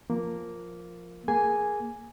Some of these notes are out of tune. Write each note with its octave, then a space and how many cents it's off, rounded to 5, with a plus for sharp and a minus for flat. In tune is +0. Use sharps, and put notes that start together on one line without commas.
F3 +0 A#3 +0
A#3 +0 G#4 +0 G#5 +0